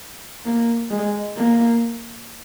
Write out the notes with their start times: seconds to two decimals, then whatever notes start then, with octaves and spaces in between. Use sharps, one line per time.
0.45 A#3
0.91 G#3
1.37 A#3